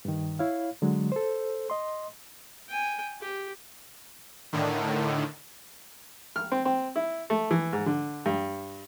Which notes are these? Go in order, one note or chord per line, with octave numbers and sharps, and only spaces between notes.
G2 D#3
E4 C#5 F5
D3 F#3 G#3
A4 C5
D#5 C6
G5 G#5
G4
A2 D3 D#3
F6
C4
C4
E4
A3
E3
G#2
D3
G2